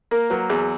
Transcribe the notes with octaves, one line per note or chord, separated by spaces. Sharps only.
A#3 A#4
F#3 B4
E2 G#4